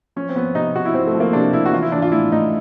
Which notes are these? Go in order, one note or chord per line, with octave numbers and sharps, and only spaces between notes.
F3 C#4
C4
F3 B3
C3 D#4
C3 F#4
E4
F3 C4
A3
F3
A#3
C3 D4
C3 E4
F#4
E3 F4
E4
E3 D4
F4
A2 E4
A2 D#4